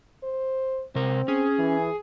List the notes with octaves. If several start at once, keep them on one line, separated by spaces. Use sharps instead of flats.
C5
C3 C4 A#4
C#4 G#4
E3